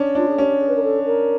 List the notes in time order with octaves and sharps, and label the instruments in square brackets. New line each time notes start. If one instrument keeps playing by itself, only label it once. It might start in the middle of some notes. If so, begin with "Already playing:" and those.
Already playing: [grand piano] C#4 D4
[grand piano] D4 [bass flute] F4
[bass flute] G#4
[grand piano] C#4 [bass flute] G4
[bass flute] G#4
B4
A#4
A4
A#4